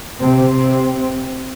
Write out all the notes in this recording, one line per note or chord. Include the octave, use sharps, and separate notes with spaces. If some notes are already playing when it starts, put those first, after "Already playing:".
C3 C4